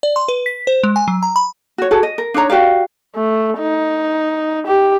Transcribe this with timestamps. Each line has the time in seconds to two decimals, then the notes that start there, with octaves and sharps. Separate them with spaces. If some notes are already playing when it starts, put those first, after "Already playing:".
0.03 D5
0.16 C6
0.28 B4
0.46 B6
0.67 C5
0.83 G#3
0.96 G#5
1.08 F#3
1.23 A#5
1.36 B5
1.78 F#4 C#5
1.91 F#4 G#4 A4
2.03 D#5
2.18 A#4
2.34 D4 D#4 C#5 A#5
2.50 F#4 G4 D5 F5
3.16 A3
3.59 D#4
4.67 G4